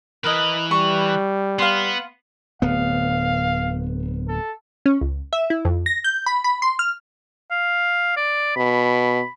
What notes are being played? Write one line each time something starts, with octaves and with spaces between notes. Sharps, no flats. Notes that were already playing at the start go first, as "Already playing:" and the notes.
E3 A#4 B4 D#5
G3 C#6
B3 F5 C6
D1 B3 F5
A4
C#4
C#2
E5
E4
F2
A#6
G6
B5
B5
C6
F6
F5
D5
B2 B5